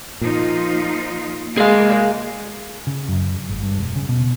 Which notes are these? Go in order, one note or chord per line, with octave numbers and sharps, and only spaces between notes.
A#2 F3 D#4 F4
G#3 A#3 G#4 F5
C#3
F#2
G#1
G2
E1
C#3
B2